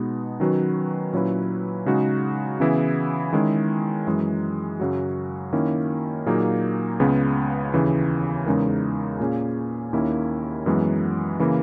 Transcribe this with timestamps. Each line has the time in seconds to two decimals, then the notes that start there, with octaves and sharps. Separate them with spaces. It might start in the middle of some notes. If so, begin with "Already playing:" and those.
Already playing: B2 G#3 B3 D#4
0.40 D#3 F#3 C#4 F#4 B4
1.13 A#2 F#3 C#4 E4 B4
1.86 C#3 G#3 D#4 F#4
2.60 C#3 E3 B3 E4 G#4
3.33 D#3 G#3 C#4 E4 G#4
4.07 F#2 E3 G#3
4.80 F#2 C#3 F#3 C#4 F#4
5.53 D#3 A#3 C#4 E4
6.26 A#2 F#3 A#3 D#4 G#4
7.00 C#2 C#3 G#3 B3
7.74 D#2 C#3 E3
8.46 E2 C#3 G#3 D#4 A#4
9.20 A#2 A#3 C#4 G#4
9.93 D#2 D#3 A#3 C#4 E4
10.66 F#2 E3 G#3 B3
11.39 C#3 E3 A#3